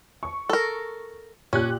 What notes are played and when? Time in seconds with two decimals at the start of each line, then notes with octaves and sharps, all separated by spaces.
0.23 C#6
0.50 A4 A#4
1.53 A#2 C#4 G4 F#6